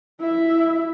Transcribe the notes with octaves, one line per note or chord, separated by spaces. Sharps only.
E4 E5